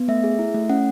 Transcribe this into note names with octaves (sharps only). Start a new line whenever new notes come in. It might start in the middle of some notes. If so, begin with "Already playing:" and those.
Already playing: B3
A3 E5
G#4
E4
A3
C#4 F#5